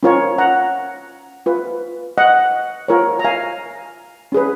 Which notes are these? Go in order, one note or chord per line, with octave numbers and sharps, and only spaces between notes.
C#4 F4 A#4 C#5
F#5 A#5
F4 B4
D#5 F#5
F4 A#4 C#5
A#5
F5 G#5
C#4 G#4 B4